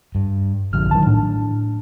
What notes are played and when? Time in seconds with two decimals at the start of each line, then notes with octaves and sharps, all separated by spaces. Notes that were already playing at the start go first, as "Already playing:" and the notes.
0.15 G2
0.73 A#1 D3 F3 F6
0.91 D#3 E3 F#3 A5
1.06 A2 D4